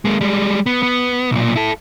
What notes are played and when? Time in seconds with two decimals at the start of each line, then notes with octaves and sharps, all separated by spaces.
0.05 G#3 A#3
0.21 G3 G#3
0.66 B3
0.83 B3
1.31 B1 A#2
1.56 E4 A4